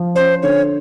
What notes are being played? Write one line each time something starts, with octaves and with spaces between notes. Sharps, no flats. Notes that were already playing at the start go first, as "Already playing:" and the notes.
Already playing: F3
C#4 C5
D3 C#5